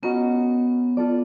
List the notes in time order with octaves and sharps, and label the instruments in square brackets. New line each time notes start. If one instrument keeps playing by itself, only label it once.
[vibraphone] B3 [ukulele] C#4 F#4 A#4 D#5
[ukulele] F4 A4 D5